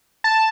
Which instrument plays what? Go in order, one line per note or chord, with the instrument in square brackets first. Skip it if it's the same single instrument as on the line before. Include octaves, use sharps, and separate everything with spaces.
[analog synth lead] A5